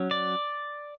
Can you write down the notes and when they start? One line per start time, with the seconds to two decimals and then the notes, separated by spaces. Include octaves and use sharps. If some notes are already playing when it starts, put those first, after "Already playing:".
Already playing: F#3 C#4
0.11 D5